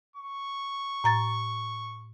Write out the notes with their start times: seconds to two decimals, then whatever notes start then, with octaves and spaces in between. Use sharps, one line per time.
0.16 C#6
1.04 A2 A#5 A6